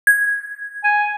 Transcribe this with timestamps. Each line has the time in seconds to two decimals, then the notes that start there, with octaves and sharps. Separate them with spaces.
0.07 G#6
0.84 G#5